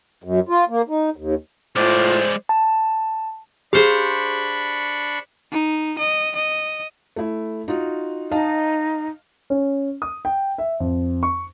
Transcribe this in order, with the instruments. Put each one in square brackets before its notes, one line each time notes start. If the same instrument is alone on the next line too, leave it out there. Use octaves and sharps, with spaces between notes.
[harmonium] F#2
F4
A#3
D#4
D#2
[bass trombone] A2 [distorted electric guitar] G#3 D5 [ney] F4 [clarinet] C5
[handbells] A5
[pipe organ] D4 B5 C#6 [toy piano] G4 G#4 [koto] C5 F5
[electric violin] D#4
D#5
D#5
[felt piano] A3 E4
D#4 F4 F#4
[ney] D#4 [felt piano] D#5 F5 A5
[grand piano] C#4
D#6
G5
E5
F2
C#6